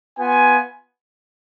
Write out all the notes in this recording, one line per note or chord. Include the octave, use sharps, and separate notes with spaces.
B3 F4 G#5